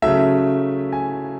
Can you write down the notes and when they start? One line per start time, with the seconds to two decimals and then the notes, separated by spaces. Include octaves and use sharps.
0.02 C#3 F#3 A3 E5
0.92 G#5